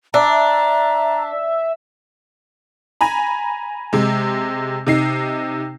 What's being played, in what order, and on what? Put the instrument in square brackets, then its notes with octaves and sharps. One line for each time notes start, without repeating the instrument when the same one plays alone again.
[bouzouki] D4 [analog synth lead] E5 [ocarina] A#5
[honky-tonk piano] G#5 A#5 B5
C3 G#3
C3 D#4 C7